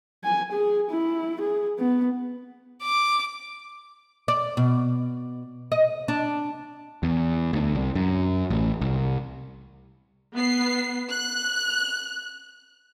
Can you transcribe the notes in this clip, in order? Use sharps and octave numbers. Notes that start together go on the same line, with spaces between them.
G#5
G#4
E4
G#4
B3
D6
D5
B2
D#5
D4
E2
D2
C2
F#2
A1
C2
B3 C7
F#6